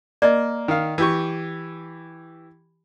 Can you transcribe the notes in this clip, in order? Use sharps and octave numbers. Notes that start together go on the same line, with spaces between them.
A#3 D5 D#5
D#3 F5
E3 G4 C#6